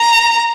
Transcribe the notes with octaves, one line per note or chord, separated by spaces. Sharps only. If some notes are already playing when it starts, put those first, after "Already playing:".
Already playing: A#5